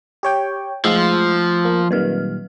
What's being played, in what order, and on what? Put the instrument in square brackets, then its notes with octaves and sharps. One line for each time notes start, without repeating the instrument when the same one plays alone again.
[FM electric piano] G4 C#5 G5
[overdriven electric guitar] F3 [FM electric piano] G#3 F4 [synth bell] A3 E6 C7
[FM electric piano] A#3
[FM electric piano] A#2 D#3 G3 [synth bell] F#3 B4 F6